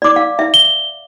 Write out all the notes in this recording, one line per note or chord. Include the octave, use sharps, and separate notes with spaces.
D5 D6
F5
E5
G7